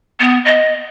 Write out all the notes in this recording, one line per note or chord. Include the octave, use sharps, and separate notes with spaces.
B3
D#5